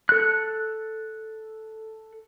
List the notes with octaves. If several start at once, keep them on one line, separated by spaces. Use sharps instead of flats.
A4 F#6